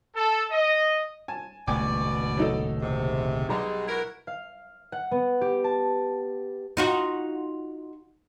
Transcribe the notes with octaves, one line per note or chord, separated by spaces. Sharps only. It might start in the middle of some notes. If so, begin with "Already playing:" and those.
A4
D#5
G#5 A5
D#1 C#2 B2 A3 D5 G5 G#5 D6
F#3 D#4 A4
D#2 G#2 C3
B1 G3 G#3 A#5
E4 F#4 A#4
F5
F#5
B3
G4
A5
D#4 F4 F#4